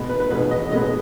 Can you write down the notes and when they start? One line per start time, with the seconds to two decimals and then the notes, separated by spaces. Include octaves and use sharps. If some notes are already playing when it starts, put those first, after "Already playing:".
Already playing: B2 G#3 B3
0.09 B4
0.20 B4
0.30 B2 G#3 B3 B4
0.51 D#5
0.71 B2 G#3 B3 D#5